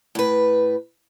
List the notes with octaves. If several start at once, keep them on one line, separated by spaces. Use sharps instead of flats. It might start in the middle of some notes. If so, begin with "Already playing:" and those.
A2 B4